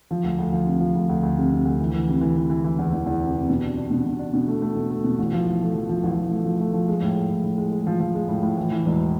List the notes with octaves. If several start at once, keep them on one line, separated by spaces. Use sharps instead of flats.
F3
D2
D2
F3
C3
F3
D2
D2
D2
C3
C3
D2
E3
E3
C3
E3
E3
E3
E3
E2
E2
E2
C3
C3
B2
D4
D4
B2
B2
D4
B2
A3
A3
B2
A3
B2
A1
F3
A1
A3
F3
F3
A1
A1
A3
F3
A3
F3
G#3
A2
G#3
A2
A2
G#3
G#3
F3
F3
G#3
A2
A2
E3
E3
E1